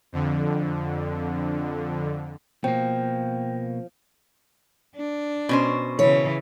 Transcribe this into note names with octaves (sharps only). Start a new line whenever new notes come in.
F2 D3
B2 F3 A#3 G5
D4
B2 C#4 C5
C#3 E3 C#5